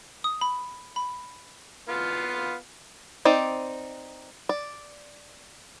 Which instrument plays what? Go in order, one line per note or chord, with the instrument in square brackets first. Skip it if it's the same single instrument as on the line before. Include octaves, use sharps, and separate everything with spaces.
[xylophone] D#6
B5
B5
[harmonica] B3 F4 F5
[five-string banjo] C4 D#4 D5
D5